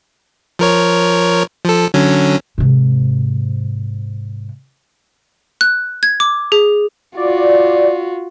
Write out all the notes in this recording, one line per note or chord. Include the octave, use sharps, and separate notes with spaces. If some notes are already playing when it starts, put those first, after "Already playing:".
F3 A#4 C#5
F3 A4
D3 F#3 C#4
G#2 C3
F#6
G#6
D6
G#4
F4 F#4 D5